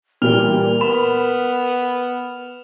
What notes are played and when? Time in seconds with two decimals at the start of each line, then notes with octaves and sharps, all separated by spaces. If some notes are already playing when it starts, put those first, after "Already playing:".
0.22 A#2 E3 G3 A#4 F6 F7
0.81 B3 B5 E7